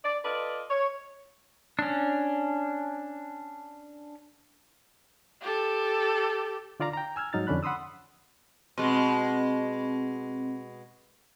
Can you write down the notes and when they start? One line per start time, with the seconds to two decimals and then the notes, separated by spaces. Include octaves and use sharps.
0.04 D5
0.25 F4 A4 B4 D5 D#5
0.70 C#5
1.79 C#4 D4
5.41 G4 A4
6.80 D3 F4 D5 F5 A#5 D6
6.93 G5 A#5
7.16 G#5 E6 F6 G#6
7.33 G#2 F#3 D#4 F6 A6
7.47 F2 D3 C#4 D4 B5 F#6
7.63 F#5 B5 C6 D#6 E6
8.78 B2 G#3 C4